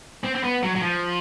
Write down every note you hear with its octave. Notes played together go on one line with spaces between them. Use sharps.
C4
C4
B3
F#3
F#3
F3